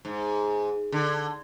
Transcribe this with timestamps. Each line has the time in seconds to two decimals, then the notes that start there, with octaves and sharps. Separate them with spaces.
0.05 G#2
0.92 D3